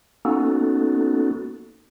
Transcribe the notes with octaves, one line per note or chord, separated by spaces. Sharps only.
A#3 B3 C#4 D#4 F#4 A4